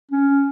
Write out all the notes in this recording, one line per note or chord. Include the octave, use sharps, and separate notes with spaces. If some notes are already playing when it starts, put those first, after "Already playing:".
C#4